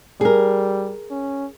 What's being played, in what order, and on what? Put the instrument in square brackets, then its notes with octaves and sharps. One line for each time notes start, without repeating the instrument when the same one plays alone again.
[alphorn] G3 [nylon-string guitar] G#4 A#4
[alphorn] C#4